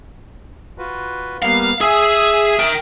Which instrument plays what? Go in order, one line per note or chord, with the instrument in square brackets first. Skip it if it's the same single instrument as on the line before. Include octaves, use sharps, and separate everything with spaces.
[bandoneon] F4 F#4 B4
[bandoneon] G3 A#3 B3 [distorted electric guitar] F5
[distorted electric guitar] G#4 [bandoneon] E5 D#6 E6
[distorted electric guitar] A#4 G5